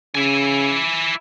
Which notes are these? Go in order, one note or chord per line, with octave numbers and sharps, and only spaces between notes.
C#3 E4 G#5